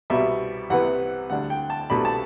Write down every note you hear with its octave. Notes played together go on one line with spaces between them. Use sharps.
C2 B2 G3 E5
C2 C3 E3 B3 F#5
D2 D3 G3 D4 F#5
G5
A5
C2 B2 A3 D4 B5
A5